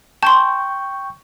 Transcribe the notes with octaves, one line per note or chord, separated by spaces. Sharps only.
G5 A5 C6 C#6 G6